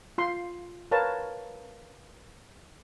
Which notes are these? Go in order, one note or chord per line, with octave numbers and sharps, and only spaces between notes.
F4 C6
A#4 B4 C#5 F5 A5